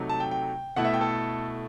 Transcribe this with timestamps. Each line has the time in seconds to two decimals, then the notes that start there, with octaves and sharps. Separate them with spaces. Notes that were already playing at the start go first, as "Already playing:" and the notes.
Already playing: C3 F#3 A3 D#4
0.09 A5
0.20 G5
0.31 G5
0.76 B2 A3 E4 F#5
0.85 E5
0.94 G5
1.01 A4